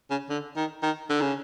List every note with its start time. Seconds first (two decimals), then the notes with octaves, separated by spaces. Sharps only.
0.11 C#3
0.30 D3
0.56 D#3
0.83 D#3
1.09 D3
1.21 C#3